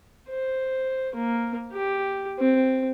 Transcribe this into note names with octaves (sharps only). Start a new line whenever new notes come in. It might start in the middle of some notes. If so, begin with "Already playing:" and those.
C5
A#3
G4
C4